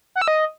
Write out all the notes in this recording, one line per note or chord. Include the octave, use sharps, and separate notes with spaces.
F#5
E6
D#5